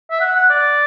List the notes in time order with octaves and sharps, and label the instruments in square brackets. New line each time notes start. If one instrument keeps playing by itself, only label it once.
[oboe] E5
F#5
F#5
D5